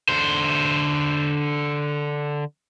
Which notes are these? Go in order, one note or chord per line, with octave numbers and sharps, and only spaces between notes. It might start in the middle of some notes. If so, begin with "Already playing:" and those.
D3 C5